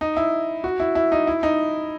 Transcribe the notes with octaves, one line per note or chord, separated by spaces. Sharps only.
D#4
E4
F#4
E4
E4
D#4
E4
D#4